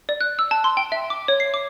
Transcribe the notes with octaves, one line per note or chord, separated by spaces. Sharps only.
D5
F#6
E6
A5
C6
G5
E5
D6
C#5
C7
D6